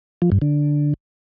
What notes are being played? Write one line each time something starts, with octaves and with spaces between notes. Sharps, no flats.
F3
G2
D3